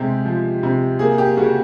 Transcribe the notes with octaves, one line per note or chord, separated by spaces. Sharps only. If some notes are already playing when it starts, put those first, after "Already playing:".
Already playing: C3 G#3 G4
F3
C3
A#3 G#4
G4
C#3 F#4